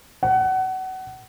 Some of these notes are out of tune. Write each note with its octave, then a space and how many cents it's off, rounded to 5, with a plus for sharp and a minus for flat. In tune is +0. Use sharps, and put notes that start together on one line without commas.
F#5 +25